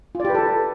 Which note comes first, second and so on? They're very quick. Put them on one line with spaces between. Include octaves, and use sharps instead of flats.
F4 D5 G4 B4 A4